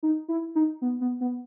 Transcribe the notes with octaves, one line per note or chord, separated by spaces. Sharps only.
D#4
E4
D#4
B3
B3
B3